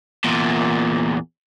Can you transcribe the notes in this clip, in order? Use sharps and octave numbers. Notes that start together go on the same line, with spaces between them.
E2 A#2